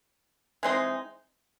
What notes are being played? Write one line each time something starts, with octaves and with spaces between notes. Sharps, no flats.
E3 G#3 C4 D#4